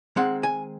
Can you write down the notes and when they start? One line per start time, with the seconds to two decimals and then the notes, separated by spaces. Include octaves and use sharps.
0.16 D#3 G#3 C4 F#5
0.43 G#5